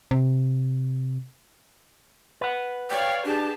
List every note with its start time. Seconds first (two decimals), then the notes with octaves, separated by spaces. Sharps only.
0.11 C3
2.41 B4 F#5
2.91 C#5 D5 F5 G5
3.25 D4 G4 G#4 A5